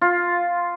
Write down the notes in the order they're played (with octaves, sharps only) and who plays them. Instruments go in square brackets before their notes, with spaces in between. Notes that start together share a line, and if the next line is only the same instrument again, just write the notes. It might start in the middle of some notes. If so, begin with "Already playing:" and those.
[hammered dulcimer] F4